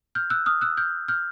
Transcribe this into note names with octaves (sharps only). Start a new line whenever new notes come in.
F6 G6
E6 F#6
D#6 F6
E6 F#6
F6 G6
F6 G6